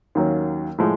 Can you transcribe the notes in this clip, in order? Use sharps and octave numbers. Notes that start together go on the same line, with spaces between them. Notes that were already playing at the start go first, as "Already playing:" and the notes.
D#2 D#3 F#3 A#3 C#4
A2 F3 G#3